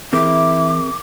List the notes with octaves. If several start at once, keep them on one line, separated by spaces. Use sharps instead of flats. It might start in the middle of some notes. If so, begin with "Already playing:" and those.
E3 C4 E4 G#4 A#4 D6